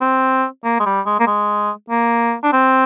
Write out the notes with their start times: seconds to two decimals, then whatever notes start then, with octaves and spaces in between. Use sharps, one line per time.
0.01 C4
0.64 A#3
0.80 G#3
0.86 G3
1.06 G#3
1.20 A#3
1.27 G#3
1.90 A#3
2.43 D4
2.53 C4